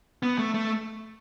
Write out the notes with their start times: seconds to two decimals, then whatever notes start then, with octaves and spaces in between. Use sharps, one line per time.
0.23 B3
0.38 A3
0.54 A3